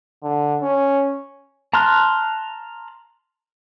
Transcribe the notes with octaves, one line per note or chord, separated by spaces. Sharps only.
D3
C#4
A5 A#5 C6 F6 F#6